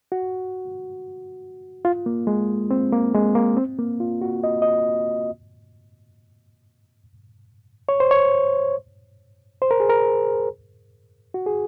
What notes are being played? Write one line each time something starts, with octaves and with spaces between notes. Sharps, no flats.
F#4
F4
A#3
G#3
C4
A#3
G#3
A#3
C4
A#3
F4
F#4
D#5
D#5
C#5
C5
C#5
C5
A#4
G#4
A#4
F#4
G#4